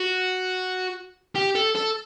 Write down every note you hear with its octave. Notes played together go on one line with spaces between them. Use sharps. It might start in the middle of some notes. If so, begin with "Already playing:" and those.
Already playing: F#4
G4
A4
A4